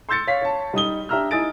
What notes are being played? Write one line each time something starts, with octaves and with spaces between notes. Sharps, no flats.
C6 E6 G6 A6 C#7
C#5 F5 B6
C#5 A5
G3 D#4 D#6 G7
D4 G4 E5 A#5 E6 F6
D#4 E4 G#5 D#6 A6 D7